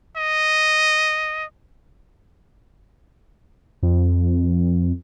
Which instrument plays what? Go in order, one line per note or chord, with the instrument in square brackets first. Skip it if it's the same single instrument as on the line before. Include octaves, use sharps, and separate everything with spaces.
[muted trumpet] D#5
[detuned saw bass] F2